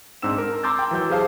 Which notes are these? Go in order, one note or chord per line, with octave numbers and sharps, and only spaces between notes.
G#2 C4 D4 E6 E7
A#4
A#5 C6 D6 E6 G6 A6
G5
E3 F#3 G6
G4 G#4 C5 F5 A5